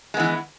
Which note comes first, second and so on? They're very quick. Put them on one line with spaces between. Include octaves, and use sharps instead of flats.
G#3 B3 E3